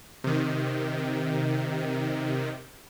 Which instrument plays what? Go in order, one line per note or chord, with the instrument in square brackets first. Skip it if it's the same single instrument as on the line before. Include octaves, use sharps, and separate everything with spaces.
[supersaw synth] C3 D#3